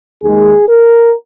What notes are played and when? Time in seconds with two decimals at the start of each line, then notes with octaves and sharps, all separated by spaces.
0.22 D#2 D#3 G#3 G#4
0.67 A#4